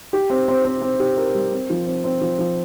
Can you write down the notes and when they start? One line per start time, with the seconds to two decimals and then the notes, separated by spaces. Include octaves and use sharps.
0.13 G4
0.30 C4
0.48 C4
0.65 C4
0.82 C4
1.00 G4
1.17 A#4
1.35 G3
1.52 C4
1.70 F3
1.87 C4
2.04 C4
2.21 F3
2.38 F3